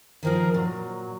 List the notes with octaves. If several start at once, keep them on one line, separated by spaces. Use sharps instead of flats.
D#3 F3 G#4 A#4
A#2 F#3